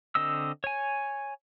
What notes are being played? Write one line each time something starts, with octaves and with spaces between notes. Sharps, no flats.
D3 C4 D#5 E6
C#5 G#5